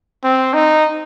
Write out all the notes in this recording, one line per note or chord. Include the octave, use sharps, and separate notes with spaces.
C4
D#4